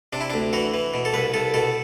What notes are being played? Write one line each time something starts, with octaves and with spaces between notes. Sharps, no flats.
C3 D4
E4
D2 D4
E3 F#4
E3
B2
A4
C2 B4
C2 A4
B2 A4